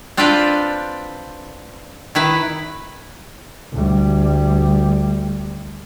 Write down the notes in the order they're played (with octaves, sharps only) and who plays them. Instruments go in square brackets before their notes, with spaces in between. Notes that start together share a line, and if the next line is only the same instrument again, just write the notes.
[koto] C4 D4 F4 A4 B4 D5
D#3 E4 B4
[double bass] D2 G3